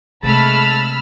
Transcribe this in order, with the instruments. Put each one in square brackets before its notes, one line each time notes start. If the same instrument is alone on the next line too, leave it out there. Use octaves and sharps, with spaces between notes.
[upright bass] C3 [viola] G#3 A3 [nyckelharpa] A5 [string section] B5 E6 F6